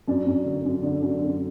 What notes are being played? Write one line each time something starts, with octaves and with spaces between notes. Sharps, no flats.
F#2 D5
F#2
D3
F#2
D3 D5
F#2
F#2